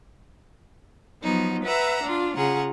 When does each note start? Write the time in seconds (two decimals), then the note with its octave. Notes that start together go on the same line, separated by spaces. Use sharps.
1.23 F3 F#3 B3 D#4
1.64 B4 E5 F#5 A#5 E6
2.03 D4 F4
2.36 C#3 F4 G#4 F#5 A#5